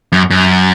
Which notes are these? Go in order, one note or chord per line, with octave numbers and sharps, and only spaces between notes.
F#2
F#2